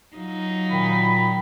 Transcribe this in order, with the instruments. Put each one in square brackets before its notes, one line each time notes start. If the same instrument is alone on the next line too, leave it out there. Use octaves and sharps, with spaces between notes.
[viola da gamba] F#3 D#4 F4
[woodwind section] A#2 B5 [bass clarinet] D#3